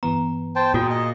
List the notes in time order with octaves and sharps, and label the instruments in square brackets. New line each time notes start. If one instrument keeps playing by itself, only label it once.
[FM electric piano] G2 E3 B3 [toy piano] A#5
[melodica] C5 G5 A5
[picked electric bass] A#2 [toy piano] F4 F#4 [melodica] G#4 G5
[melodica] G#4 D#5